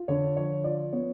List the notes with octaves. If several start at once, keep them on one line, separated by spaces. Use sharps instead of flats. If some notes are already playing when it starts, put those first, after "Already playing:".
Already playing: F4
D3 C#5
F3 C#5
F4 D5
B3 C#5